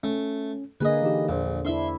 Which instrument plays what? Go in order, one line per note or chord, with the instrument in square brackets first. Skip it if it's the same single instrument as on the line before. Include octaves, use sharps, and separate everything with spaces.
[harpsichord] A3 [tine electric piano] C#4
[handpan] D3 A#3 G#4 [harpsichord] B4 D#5
[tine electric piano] E3 D#4 G4
[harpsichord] A#1 [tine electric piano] E2 C5
[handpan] D4 E4 [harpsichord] E5 C6